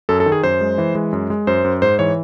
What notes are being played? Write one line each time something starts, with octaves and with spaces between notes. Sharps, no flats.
F#2 A4
A4
D#3
G#4
F#2 C5
G#3
E3
G#3
F#2
G#3
F#2 C5
F#2
G#2 C5
E3 C#5